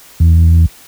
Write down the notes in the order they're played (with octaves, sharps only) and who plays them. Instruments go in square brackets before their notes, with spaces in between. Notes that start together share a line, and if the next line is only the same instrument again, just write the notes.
[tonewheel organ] E2